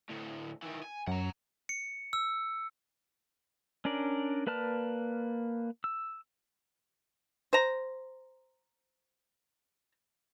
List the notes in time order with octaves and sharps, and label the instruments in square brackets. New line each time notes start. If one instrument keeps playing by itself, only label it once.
[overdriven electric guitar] D2 A2
D#3 E3
G#5
[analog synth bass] F#2 [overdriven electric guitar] F#5 A#5
[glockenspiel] C#7
E6
[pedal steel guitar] C#4 D4 A#4 D5
A#3 B4 D5 A5 F6
E6
[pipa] C5 A#5